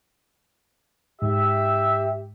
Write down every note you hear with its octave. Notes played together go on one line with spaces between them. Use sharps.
G#2 G4 E5